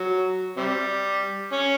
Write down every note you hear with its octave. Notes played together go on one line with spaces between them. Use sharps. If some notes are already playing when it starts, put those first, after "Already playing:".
Already playing: F#3
C3 G3
C#4